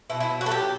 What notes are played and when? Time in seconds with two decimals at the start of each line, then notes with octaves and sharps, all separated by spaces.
0.10 B2 E4
0.20 E4
0.30 F#3
0.41 F#4
0.46 A4
0.51 F#3 G4